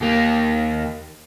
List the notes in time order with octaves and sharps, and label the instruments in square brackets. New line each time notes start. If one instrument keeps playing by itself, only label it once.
[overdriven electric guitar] D#2 A#3